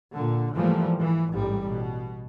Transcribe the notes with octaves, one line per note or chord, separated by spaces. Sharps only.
A#2 D3
G#2 E3 F3 G3 A3 A#3
E3
A1 G#2 G3
B2